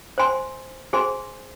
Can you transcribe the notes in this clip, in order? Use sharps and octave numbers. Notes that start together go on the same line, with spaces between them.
C5 G#5 C6
G#4 C5 G#5 C6